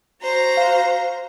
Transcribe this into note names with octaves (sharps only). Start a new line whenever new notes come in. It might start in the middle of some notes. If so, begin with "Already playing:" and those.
F#4 C5 A#5
F5